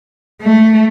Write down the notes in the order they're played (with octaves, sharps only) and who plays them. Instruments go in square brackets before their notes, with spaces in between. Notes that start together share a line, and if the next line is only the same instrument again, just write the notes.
[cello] A3